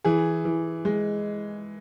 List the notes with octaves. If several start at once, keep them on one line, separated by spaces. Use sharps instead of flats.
E3 G#4
E3
G#3